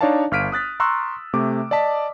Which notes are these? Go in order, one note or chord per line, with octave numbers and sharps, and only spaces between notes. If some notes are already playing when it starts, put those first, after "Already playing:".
D4 D#4 C#5 D5 F5 A5
G1 F5 F6 B6 D7 D#7
D#6 F#6 A6 B6
A#5 C6 C#6 E6 F#6
C3 A3 D6
D5 D#5 A5 B6